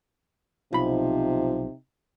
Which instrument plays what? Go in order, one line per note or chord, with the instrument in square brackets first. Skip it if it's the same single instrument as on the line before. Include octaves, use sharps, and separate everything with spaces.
[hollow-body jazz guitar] B1 B5 [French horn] C3 [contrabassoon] F3 [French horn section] D#4